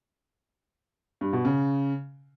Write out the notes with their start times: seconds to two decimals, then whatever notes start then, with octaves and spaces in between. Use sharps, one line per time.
1.21 G2
1.33 B2
1.45 C#3